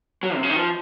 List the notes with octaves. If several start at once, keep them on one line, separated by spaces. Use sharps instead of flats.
F#3
C3
C#3
D#3
F3